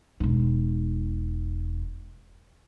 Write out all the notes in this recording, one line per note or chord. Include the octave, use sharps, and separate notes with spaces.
E1 D#4